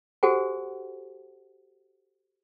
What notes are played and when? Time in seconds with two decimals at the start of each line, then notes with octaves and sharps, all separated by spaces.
0.23 F#4 G4 A4 C5 F#5 G#5